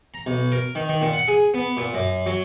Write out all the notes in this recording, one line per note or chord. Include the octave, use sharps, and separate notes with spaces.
A#5
B1
A#4
D#3
D#3
A#2
F#5
G#4
B3
A#2
F#2
F#3